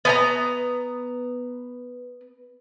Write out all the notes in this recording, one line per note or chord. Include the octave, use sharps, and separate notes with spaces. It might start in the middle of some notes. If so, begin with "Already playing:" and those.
B3 G#5 A#5